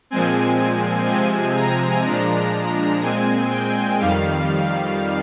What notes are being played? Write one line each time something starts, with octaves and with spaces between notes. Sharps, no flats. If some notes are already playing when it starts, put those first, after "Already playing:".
A#2 F3 G#3 C4 G#5
C3 F3 G#3 C4 G#5
A#5
A#2 F3 G#3 D4
A#2 G#3 C4 G#5
G5
F2 D#3 G3 F5